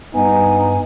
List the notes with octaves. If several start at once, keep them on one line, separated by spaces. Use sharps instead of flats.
G2 B3 D#4 G#5